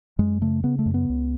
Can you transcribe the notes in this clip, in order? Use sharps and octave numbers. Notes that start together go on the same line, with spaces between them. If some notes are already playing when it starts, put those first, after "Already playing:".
F#2 G#3
C#3 A3
C#3 B3
A3
F#2
B3
C#2